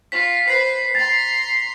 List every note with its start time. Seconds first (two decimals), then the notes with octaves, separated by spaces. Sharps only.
0.12 F4 B6
0.48 B4 C5 B6 C7
0.95 A#5 C6 A6